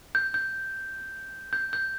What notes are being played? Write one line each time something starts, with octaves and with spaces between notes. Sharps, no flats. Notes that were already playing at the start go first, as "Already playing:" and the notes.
G6
G6
G6
G6